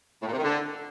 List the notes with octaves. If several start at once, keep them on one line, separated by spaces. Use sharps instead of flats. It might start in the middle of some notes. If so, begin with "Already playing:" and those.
A2
A#2
C3
D#3
D3